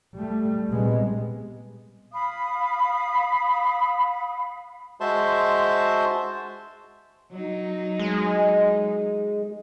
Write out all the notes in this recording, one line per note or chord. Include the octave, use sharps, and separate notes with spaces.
G3 A3
A#1 C3 G3 G#3 B3
F5 B5 D#6
G#3 F#4 C5 E5 A5 C6
F#3 D#4
G#3